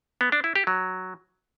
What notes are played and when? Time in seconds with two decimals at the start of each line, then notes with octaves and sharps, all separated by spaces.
0.21 B3
0.32 D4
0.44 E4
0.56 G4
0.67 F#3